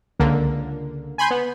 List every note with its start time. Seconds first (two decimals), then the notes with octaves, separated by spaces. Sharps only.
0.19 C#2 D3 A#3
1.18 G#5 B5 C6 G6
1.30 B3